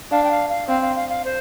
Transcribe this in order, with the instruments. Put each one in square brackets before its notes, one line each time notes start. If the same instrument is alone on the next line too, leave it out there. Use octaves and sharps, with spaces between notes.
[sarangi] D4 [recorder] F5
[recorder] G5
F5
F5
[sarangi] C4 [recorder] F5
[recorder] F5
F5
F5
C5